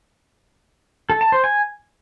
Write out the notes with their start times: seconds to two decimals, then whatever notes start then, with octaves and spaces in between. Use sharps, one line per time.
1.10 A4
1.21 A5
1.32 C5
1.44 G#5